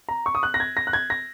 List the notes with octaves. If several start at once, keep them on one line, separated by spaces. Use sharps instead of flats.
A#5
C#6
D#6
F#6
A#6
G#6
A#6
F#6
G#6
A#6